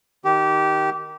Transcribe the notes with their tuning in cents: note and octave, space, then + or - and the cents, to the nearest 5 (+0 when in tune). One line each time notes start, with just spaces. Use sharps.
D#3 -5 G4 -20